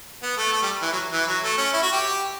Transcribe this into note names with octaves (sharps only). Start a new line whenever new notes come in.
B3
A3
A3
G3
E3
F#3
E3
F#3
A3
C#4
E4
F#4
G4